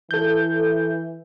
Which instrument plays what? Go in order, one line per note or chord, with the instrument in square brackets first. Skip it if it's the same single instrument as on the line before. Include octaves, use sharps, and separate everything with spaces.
[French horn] E3 [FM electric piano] A4 G6